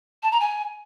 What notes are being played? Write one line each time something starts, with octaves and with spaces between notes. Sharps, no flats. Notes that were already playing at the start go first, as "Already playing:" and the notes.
A5
A#5
G#5